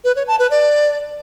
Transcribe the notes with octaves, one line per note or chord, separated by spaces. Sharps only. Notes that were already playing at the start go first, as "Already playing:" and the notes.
B4
C#5
A5
B4
D5